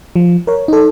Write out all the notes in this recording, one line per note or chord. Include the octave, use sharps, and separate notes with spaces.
F3
A#4 C#5
D#4 A4